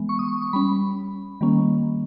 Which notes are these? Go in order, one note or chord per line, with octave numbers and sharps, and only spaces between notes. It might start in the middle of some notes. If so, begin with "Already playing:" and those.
Already playing: E3 G#3 B3
C#6
D#6
C#6
C#6
G3 C#4 B5
D#3 G3 A#3 C#4